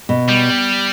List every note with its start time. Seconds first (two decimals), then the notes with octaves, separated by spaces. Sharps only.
0.09 B2
0.29 G3